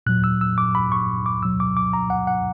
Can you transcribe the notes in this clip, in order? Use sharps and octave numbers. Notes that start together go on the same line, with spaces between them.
A#2 F#3 F#6
E6
E6
D6
B5
C#6
D6
B2 F#3 E6
D6
D6
A#5
F#5
F#5